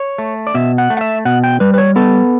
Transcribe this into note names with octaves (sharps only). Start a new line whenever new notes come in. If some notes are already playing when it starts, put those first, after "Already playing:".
Already playing: C#5
A3
D5
B2 E5
F#5
A3
F#5
E5
B2 F#5
G5
G3 B4
B4
C#5
B3 A4